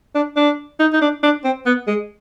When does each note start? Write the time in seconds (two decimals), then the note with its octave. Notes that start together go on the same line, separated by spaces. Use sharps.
0.15 D4
0.36 D4
0.79 D#4
0.93 D#4
1.01 D4
1.23 D4
1.44 C4
1.66 B3
1.87 G#3